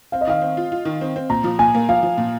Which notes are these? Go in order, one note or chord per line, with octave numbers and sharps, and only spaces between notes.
C4 F5
D#5
D#3 F5
C4
F4
F4
D#3
C4
C4
A#2 A#5
F3
A#2 G#5
A#3
F3 F5
F3
A#2